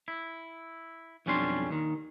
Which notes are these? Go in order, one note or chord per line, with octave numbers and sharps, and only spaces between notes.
E4
B1 F2 G3 C#4 D4 C6
D#2 D#3